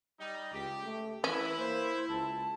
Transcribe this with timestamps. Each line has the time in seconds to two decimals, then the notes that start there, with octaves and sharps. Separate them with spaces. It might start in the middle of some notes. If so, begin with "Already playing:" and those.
0.19 G3 D#4
0.53 C#2 G4
0.85 A3
1.24 E3 C#4 E4 B4
1.58 A#3 C5
2.09 C#2 A5